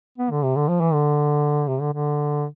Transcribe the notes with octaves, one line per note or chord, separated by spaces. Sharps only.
B3
D3
C3
D3
F3
E3
D3
C3
D3
D3